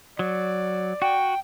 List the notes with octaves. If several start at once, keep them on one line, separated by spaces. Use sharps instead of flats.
F#3 D5
F#4 G5